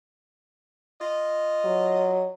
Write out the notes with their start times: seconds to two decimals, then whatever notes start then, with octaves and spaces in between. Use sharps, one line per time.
1.01 F4 D#5
1.65 F#3